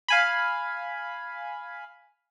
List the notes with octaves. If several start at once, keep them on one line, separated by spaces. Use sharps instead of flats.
F5 G#5 B5